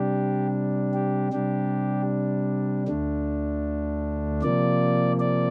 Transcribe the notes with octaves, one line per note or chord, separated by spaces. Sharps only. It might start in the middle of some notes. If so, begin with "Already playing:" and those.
Already playing: C3 G3 D4 G4
G4
C3 G3 D4 G4
D2 D3 A3 D4
C3 F3 A#3 D5
D5